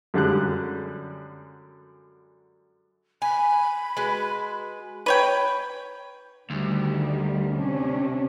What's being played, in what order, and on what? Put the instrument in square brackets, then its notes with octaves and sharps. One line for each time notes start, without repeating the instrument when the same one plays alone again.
[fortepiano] F#2 D3 G3 G#3 F#6
[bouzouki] G#5 [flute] B5
[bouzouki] G#3 F#4 B4
[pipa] B4 C#5 G5
[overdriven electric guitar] D2 [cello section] D#3 G3
[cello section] C3 C#4 D4